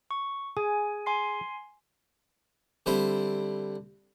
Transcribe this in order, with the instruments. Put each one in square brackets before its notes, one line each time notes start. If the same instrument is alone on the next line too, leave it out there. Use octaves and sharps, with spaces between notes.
[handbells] C#6
[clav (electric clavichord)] G#4 [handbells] G#5
[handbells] G#5 C6 C7
[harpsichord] D3 G3 C4 E4 C5